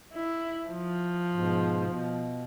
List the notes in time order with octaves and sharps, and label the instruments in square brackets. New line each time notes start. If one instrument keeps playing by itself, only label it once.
[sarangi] E4
F3
[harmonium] G#2 B2
B2